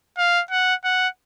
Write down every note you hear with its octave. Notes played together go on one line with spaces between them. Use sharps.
F5
F#5
F#5